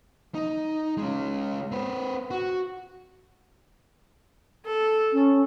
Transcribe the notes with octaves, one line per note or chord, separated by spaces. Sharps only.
D#4
G#3 C#4
C4 B4
F#4
A4
C#4